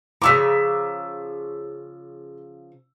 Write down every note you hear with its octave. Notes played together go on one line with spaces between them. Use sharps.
C#3 F3 A#5 D6 E6 B6